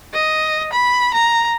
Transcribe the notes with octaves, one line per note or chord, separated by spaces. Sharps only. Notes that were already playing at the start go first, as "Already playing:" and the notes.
D#5
B5
A#5